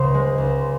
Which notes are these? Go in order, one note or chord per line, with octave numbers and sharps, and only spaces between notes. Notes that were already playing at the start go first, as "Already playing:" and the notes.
Already playing: C#2 C#3 C5
G#3
C#2